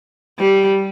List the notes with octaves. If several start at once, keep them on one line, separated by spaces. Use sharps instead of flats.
G3